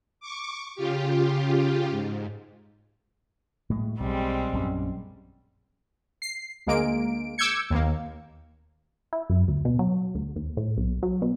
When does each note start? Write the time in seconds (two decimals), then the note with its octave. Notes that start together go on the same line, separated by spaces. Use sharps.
0.20 C#6 D6
0.76 C#3 F4 G4
1.90 G#2
3.70 A2 G#3
4.00 B1 G3 G#3 C4
4.53 A#1 F#2 C#4
6.22 C7
6.67 D2 G#3 A#3 D7
7.38 D6 E6 G6 G#6 C#7
7.70 D#2 A#3
9.13 E4
9.30 F#2
9.48 D2
9.65 B2
9.79 F#3
10.15 D2
10.36 D#2
10.57 A2
10.77 B1
11.03 F#3
11.22 B2